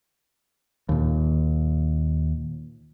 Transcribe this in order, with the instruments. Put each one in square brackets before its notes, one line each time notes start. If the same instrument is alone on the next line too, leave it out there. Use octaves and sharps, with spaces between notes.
[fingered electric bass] D#2 A#2